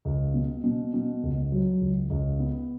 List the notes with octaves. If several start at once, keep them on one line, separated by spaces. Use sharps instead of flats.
C#2
B2
B2
B2
C#2
F#3
C#2
C#2
B3